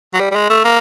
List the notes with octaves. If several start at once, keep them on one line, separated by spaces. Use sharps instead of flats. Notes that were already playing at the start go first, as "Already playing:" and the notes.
F#3
G3
G3
G#3
A3
A#3